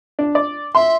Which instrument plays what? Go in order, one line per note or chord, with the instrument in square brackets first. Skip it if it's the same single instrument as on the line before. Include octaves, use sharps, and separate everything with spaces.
[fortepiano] D4
D5
[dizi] E5 [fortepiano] C6